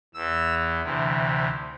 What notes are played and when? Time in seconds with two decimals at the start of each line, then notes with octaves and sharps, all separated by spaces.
0.14 E2 E3 E6
0.82 D2 C3 E3